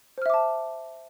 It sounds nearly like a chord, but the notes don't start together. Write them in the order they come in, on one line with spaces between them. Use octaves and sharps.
C5 F6 E5 D6 A5